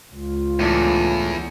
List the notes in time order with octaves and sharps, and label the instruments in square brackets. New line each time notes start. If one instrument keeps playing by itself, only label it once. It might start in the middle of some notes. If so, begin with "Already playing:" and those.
[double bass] C#2 [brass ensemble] F4
[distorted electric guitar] E2 [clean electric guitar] A2 E3 D4